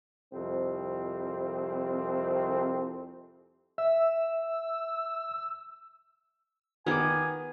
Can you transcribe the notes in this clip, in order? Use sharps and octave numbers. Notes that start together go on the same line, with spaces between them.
C2 F2 C4
E5 E6
D#3 B3 G#4 G#5 D6